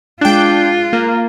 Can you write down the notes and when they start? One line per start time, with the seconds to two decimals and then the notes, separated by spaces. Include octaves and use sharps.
0.21 G#3 D4 F4 G5 F#6
0.93 A#3